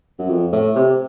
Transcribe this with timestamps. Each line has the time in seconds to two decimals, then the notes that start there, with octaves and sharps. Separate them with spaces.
0.19 F#2
0.29 F2
0.53 A2
0.76 C3